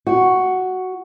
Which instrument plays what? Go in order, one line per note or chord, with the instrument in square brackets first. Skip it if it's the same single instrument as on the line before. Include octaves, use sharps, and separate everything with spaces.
[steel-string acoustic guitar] F#4